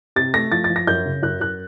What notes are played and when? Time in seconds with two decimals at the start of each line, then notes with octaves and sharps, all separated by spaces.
0.16 C3 A6
0.34 A3 A#6
0.52 F3 A6
0.64 A6
0.70 F3
0.76 A#6
0.87 F#2 G6
1.05 C#3
1.23 F#2 F#6
1.40 F#2 F#6